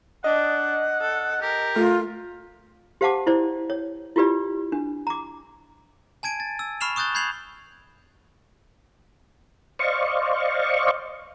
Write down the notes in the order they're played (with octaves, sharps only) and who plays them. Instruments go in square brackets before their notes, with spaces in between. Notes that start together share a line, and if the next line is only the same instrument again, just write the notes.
[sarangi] D4 [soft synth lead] D#5 [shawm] F#5
[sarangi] A4
[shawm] G4 [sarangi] A#4
[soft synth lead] A3 [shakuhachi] F4
[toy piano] G4 C5 F5 F#5 A5 D6
E4 C5 D5
C#5
E4 F4 G4 B4 D5
D4
A#5 D6
[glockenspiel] G#5 A5 G#6 D7 D#7
A6
E6
B5 C#6 F6 C7 E7 F7
C#6 D#6 F#6 G6 A6 G7
B5 G6 G#6 C7 F7 F#7
[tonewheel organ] C5 D5 D#5 F5 C#6